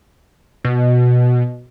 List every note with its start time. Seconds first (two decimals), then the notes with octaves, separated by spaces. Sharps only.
0.64 B2